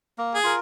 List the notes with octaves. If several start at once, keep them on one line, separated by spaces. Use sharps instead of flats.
A#3
G#4
F4 A#4